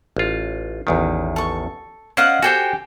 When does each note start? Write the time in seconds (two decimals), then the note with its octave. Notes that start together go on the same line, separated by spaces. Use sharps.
0.17 A1 F4
0.87 A1 E2 D#3
1.36 A4 C#6
2.17 C#4 C5 D5 D#5 F5 F#5
2.42 F#4 G4 A4 C5 G5 G#5